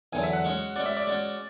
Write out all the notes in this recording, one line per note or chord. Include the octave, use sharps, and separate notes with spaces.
E2 D3 F#3 G#5
E5
F#5
G#3 C#4 F#4
G#3 C#4 F#4 D5
E5
D5
G#3 C#4 F#4